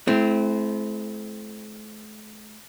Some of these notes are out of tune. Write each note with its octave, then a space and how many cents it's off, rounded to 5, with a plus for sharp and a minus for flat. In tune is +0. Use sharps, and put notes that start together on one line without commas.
A3 -45 C4 -10 E4 +0